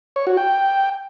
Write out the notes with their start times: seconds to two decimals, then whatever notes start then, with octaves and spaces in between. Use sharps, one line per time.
0.16 C#5
0.27 F#4
0.37 G5